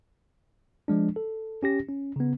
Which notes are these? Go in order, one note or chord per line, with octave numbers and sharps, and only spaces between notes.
F3 G#3 D4
A4
C#4 G4 A#6
C#4
C#3 B3